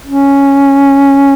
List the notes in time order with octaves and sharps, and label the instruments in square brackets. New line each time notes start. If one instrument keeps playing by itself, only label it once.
[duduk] C#4